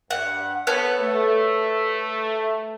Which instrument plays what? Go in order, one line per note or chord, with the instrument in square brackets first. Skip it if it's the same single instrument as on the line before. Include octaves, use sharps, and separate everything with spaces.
[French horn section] G2 [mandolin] F#5
[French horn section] B3 [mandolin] A4 B4 C#5
[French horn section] A3